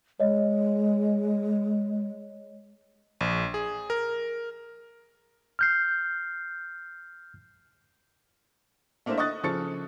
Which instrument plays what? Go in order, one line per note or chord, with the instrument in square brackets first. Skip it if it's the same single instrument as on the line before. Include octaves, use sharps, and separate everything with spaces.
[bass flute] G#3 [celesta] C#5 D#5
[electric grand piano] A#1
G#4
A#4
[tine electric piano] F6 G6 C7
[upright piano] A3 A#3 D4 E4 C5 E5
D#5 C#6 D#6 F#6 A6
C#3 F3 A4 C#6 A6 C#7